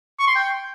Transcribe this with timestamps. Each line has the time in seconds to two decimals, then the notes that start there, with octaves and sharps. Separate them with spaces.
0.19 C#6
0.27 C6
0.35 G5